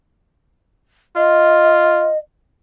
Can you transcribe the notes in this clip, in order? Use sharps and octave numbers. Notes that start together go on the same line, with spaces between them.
F4 D#5